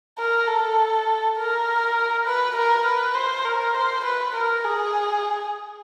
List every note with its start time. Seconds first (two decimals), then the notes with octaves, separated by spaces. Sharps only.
0.18 A#4
0.47 A4
1.37 A#4
2.26 B4
2.56 A#4
2.85 B4
3.15 C5
3.45 A#4
3.74 C5
4.05 B4
4.35 A#4
4.64 G#4